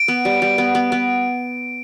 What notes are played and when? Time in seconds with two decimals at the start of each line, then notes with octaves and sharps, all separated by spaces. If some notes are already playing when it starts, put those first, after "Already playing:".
Already playing: D7
0.08 B3
0.25 G3
0.42 G3
0.58 B3
0.75 B3
0.92 B3